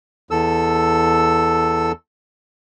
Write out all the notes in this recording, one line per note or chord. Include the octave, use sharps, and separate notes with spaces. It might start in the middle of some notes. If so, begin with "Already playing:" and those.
E2 A4 E6